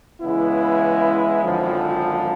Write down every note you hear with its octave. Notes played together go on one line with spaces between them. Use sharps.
C#3 E3 G#3 B3 E4
G#1 F#2 D3 F3